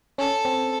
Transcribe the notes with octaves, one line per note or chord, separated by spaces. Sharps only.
C#4 A4
C4